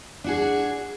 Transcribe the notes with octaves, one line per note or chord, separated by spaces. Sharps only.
D4 F#4 G#4